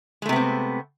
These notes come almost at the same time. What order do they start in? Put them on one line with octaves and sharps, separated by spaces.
G#3 A3 C3 B3 C4